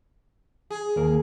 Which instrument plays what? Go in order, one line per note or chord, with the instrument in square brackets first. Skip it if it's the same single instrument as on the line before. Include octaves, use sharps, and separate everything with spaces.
[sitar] G#4
[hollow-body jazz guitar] D#2 A#3